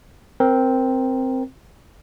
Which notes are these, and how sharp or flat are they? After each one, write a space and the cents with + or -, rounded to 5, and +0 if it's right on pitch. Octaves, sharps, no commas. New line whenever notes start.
C4 +0 A#4 +15